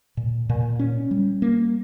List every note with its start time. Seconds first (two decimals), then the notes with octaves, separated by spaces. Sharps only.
0.17 A#2
0.49 A#2
0.79 C#4
1.11 G3
1.42 A#3